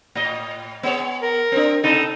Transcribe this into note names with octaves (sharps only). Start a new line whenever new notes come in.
A2 D#5
B3 G#4 C#5
A#4
C4 D4
C3 D#4 A4